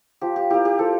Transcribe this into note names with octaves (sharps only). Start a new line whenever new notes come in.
F3 G4
G4
A#3 E4 G4
G4
F3 A4